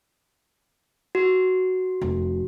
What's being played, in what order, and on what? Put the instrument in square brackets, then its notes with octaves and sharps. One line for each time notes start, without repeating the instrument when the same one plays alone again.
[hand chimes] F#4
[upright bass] F1